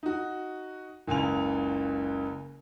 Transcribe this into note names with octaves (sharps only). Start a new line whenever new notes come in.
D#4 F#4
F#1 C#2 G#5 F7